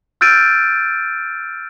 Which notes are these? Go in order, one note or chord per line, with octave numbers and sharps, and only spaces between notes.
E6 F6 G6 A6 D7 D#7